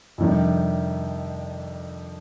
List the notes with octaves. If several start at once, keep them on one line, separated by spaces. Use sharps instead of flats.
F2 C3 D#3 G3 D4